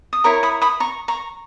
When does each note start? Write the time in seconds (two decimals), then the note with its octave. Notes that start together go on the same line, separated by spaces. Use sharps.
0.13 D#6
0.24 E4 A#4 C#5 A#5 C#6
0.43 B5 D#6
0.62 B5 D#6
0.80 A#5 C#6
1.08 A#5 C#6